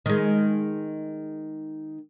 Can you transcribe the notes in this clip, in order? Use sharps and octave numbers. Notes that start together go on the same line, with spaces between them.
D#3 G#3